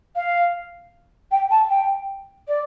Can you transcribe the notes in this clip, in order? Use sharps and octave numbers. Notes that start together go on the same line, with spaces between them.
F5
G5
A5
G5
D5